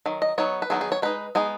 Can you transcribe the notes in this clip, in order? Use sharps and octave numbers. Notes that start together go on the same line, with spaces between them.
D#3 F#3
D#5
F#3 B3 D#4 C#5
B4
D#3 F#3 B3 D#4 G#4
G#4
C#5
G#3 D#4 B4
G#3 B3 D#4 G#4